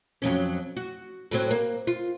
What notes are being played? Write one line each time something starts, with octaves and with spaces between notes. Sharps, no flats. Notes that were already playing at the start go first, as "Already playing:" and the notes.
F2 F#3 C#4
F#4
A2 F#3 C4
A#3
F4